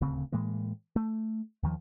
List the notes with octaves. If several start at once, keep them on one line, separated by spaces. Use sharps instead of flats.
D#1 D2 C#3 C4
A2 E3 G#3 A#3
A3
D#2 D#3 F3